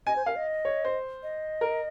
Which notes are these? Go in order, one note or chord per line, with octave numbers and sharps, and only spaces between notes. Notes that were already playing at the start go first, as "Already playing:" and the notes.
D#5 G#5
C5
A#4 F5
D#5
C#5
C5
D#5
A#4